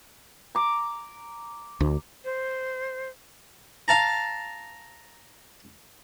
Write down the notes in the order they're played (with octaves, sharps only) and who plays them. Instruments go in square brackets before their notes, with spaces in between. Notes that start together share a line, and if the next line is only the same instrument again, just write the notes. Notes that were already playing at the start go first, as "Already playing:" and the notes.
[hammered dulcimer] A#5 D6
[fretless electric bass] D2
[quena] C5
[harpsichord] F5 A5 A#5